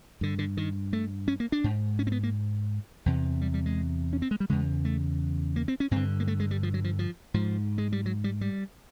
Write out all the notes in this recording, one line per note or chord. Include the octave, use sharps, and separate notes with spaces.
G2 D3
D3
D#3
A3
C#4
A#3
D4
G#2
C#4
C4
B3
A#3
E2 C3
G3
G3
G#3
C#4
C4
G#3
G3
E2 C#3 G#3
A3
A#3
C4
C#4
G2 D3 C4
A#3
A3
G#3
G3
F3
F#3
F3
F3
G#2 F3
G#3
G3
F#3
G3
G3